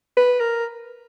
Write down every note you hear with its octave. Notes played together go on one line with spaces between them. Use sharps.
B4
A#4